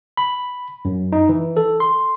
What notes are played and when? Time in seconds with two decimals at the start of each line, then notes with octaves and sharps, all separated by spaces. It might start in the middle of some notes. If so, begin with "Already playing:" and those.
0.17 B5
0.85 F#2
1.13 D#4
1.29 E3
1.57 A4
1.80 C6